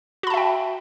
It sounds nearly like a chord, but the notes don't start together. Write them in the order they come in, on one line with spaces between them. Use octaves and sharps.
F#4 B5 A5 E5 G5